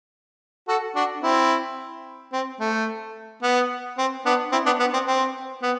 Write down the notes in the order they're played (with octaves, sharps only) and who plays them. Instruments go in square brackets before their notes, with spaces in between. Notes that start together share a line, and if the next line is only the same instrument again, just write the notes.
[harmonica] F#4 A4
D4 F#4
C4 E4
C4
A3
B3
C4
B3 D4
C4 E4
B3 D4
B3
C4
C4
B3